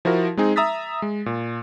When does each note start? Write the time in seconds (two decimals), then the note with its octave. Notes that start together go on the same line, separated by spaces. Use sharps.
0.05 F3 E4 F#4 A#4
0.37 G#3 C4 D#4 G#4
0.56 E5 A#5 D#6 E6 A6 B6
1.02 G#3
1.26 A#2